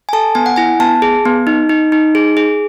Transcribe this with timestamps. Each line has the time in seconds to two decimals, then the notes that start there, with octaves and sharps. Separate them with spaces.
0.09 G#5
0.13 A4 A5
0.35 B3 G#5
0.46 F#5
0.56 E4 G#5
0.80 B3 A5
1.02 G#4
1.25 B3
1.47 D#4
1.69 D#4
1.92 D#4
2.15 G#4
2.37 G#4